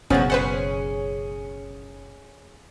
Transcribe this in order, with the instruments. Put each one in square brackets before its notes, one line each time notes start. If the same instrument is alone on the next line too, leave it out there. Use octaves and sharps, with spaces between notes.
[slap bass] F#1 B2 [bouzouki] F3 F#3 F#4 [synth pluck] B3 C#4 G#4
[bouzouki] C#4 G#4 [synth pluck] B4 C5 F#5